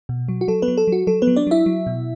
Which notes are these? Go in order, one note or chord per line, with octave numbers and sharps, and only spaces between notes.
B2
F#3
F#4
F#3 A4
B3 B4
F#3
A4
F#3 F#4
F#3 A4
B3 B4
F#3
D4 D5
F#3 E4 E5
F#3
B2